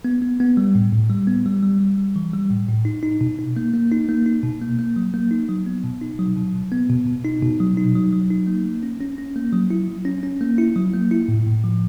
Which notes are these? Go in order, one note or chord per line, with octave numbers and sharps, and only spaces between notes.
B3
B3
B3
G3
A2
A2
G3
B3
G3
G3
G3
G3
E3
G3
A2
A2
D#4
D#4
B2
D#4
A#3
A#3
D#4
A#3
D#4
B2
A#3
A#3
F#3
A#3
D#4
F#3
B3
B2
D#4
F#3
B2
B2
B3
B2
B2
D#4
B2
F#3
D#4
F#3
F#3
D#4
A#3
A#3
C#4
C#4
C#4
A#3
F#3
E4
F#3
C#4
C#4
A#3
E4
F#3
A#3
E4
A2
A2
F3